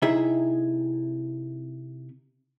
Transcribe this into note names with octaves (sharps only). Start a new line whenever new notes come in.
C3 D#4 E4 G#4 E5